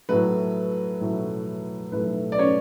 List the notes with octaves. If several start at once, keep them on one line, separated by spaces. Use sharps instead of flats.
A2 F#3 A3 B4
A2 F#3 A3
A2 F#3 A3 B4
D5
C#4 C#5